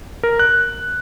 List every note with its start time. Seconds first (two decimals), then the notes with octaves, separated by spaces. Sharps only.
0.23 A#4
0.39 F#6